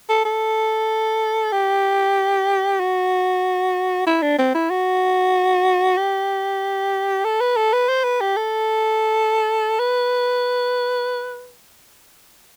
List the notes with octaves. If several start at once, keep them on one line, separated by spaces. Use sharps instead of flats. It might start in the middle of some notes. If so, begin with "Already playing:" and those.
A4
A4
G4
F#4
E4
D4
C4
E4
F#4
G4
A4
B4
A4
B4
C5
B4
G4
A4
B4